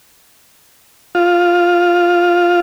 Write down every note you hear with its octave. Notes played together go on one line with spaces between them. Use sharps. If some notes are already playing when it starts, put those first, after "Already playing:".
F4